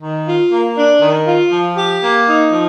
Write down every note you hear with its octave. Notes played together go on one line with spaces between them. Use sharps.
D#3
F4
A#3
D4
D#3
F4
F3
G4
A#3
D#4
F3